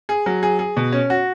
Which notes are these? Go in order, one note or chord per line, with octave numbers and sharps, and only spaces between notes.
G#4
F#3
G#4
G#4
B2
C#4
F#4